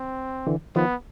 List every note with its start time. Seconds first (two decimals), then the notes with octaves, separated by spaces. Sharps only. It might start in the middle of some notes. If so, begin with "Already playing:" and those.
Already playing: C4
0.47 D3 E3
0.76 D#3 F3 B3